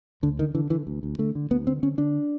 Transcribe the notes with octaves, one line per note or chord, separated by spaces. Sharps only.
D2 D3
D3 D#3
D3 E3
D3 E3
D2
D2
D3 A3
D3
D2 B3
D3 C4
D3 C#4
D3 D4